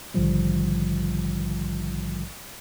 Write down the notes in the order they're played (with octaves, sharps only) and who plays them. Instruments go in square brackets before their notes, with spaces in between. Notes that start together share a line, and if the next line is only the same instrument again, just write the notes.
[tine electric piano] A#1 G#2 D3 D#3 F3 G3